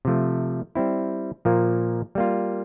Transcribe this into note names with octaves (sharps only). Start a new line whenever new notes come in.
C3 F3 A3
G3 C4 E4
A#2 F3 A#3
G3 A#3 F4